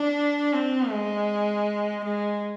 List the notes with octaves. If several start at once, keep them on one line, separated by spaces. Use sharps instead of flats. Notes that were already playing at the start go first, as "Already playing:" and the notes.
Already playing: D4
C4
G#3
G#3